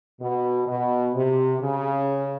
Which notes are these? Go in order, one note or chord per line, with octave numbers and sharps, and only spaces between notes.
B2
B2
C3
C#3